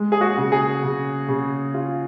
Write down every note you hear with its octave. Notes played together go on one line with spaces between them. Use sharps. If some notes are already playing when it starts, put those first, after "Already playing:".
Already playing: G#3
G#4
F#4
C#3
G#4
C#3
C#3
F4